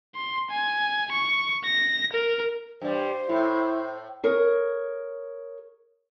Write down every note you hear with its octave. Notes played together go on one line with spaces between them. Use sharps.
C6
G#5
C#6
A#6
A#4
G2 G3 C5
A2 E4
G#4 A#4 C#5